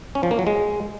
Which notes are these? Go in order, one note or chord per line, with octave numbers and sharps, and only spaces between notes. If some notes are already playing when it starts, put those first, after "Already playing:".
C#4
F3
A#3
F#3
G#3